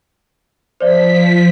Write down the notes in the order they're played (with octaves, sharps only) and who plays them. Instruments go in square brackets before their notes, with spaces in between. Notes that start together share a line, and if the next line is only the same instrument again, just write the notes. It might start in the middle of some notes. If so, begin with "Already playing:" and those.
[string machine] F3 B6 [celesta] C5 D5 E5